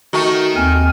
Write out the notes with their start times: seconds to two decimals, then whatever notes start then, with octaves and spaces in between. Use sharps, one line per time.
0.13 D#3 A3 F#4
0.56 D#2 C4 G#5 F6